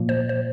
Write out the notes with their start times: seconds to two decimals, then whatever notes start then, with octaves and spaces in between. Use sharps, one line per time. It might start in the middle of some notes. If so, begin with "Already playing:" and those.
Already playing: A#2 F3 A#3
0.09 C5
0.29 C5